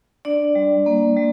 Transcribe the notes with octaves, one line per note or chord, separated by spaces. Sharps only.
D4 D5
G3
A#3
G3